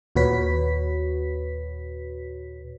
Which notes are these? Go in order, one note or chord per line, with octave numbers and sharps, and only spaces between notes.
D#2 A#2 F#4 B4 C#5 B6